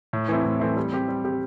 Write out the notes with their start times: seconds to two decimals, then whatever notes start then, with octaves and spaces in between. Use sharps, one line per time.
0.13 A2
0.28 E3 A3 C4 E4
0.45 A2
0.60 E3 A3 C4 E4
0.76 G3
0.92 C4 G4
1.08 G3
1.25 C4 G4